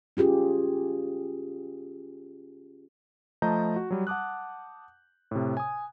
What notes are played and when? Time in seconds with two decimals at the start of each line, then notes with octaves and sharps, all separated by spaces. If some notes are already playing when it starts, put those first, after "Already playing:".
0.17 C#4 F4 G4 G#4
3.42 F3 A3 D#5 A5 A#5 G6
3.76 F#4
3.91 F#3 G3
4.07 F#5 A5 D6 D#6 F#6
5.31 A2 C3
5.57 G#5 D#6